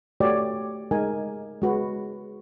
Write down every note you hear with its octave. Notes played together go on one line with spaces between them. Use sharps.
A3 F#4 G4 C#5 D5
G#3 D#4 A#4 G#5
G#3 F#4 B4